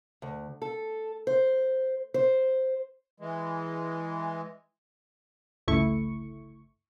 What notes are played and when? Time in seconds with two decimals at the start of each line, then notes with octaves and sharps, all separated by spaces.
0.22 D2
0.62 A4
1.27 C5
2.14 C5
3.20 E3 G#3
5.68 G1 C#2 A3 E4 C#6